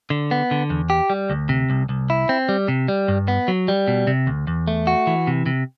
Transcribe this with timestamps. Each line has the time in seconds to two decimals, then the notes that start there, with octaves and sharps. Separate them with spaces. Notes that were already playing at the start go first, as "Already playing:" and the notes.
0.10 D3
0.31 B3
0.51 D3
0.70 E2
0.90 G4
1.10 G3
1.30 D2
1.49 C3
1.70 C2
1.89 C2
2.10 E4
2.29 C4
2.49 G3
2.68 C3
2.88 G3
3.08 G2
3.28 B3
3.48 F#3
3.68 G3
3.88 B2
4.07 C3
4.27 D2
4.47 E2
4.68 A3
4.87 F#4
5.07 E3
5.27 C3
5.46 C3